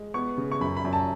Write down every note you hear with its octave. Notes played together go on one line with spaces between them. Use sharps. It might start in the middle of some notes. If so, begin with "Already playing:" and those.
Already playing: G#3
B3 C#6
C#3
C#6
F#2 B5
B5
F#2
A5